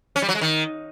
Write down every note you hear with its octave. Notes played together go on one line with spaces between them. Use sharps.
C#4
G3
F#3
G#3
D#3